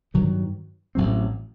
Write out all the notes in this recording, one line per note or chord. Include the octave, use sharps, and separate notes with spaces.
G2 D#3 F#3 B3
A1 A2 F#3 C4